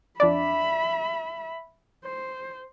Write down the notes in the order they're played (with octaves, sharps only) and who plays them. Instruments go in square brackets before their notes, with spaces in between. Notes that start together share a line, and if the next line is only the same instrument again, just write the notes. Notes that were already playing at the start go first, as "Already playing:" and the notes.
[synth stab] F2 D4 D5 [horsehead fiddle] E5 B5
[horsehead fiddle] C5